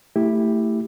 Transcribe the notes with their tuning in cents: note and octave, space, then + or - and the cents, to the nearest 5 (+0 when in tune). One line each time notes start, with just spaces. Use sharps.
A3 +25 E4 +0 G4 +10